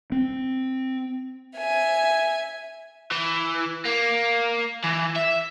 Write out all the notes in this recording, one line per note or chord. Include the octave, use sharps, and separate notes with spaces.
C4
E5 G#5
E3
A#3
E3
E5